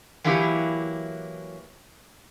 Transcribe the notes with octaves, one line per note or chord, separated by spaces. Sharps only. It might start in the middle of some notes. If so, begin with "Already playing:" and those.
E3 F#3 A#3 E4 G4 B4